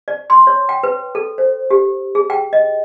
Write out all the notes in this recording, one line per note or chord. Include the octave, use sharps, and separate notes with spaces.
D5
C6
C#5
G5
B4
A4
C5
G4
G#4
G5
D#5